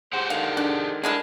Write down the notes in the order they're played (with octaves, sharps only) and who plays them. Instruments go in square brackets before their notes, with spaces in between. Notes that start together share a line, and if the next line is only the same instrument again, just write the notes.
[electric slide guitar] G4 G#4 F#5 [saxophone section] C5
[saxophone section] G#2 D3 D#3 [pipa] F5
[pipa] D4
[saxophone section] G2 G#4 A#4 [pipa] D3 G#3 E4 [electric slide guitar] D4